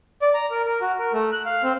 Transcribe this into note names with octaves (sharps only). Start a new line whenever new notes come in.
D5
A#5
A#4
A#4
F#4
A#4
A3
F#6
F5
C4